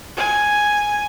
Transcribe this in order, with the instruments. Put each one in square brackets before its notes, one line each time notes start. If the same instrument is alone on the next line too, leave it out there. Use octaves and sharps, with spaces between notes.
[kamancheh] G#5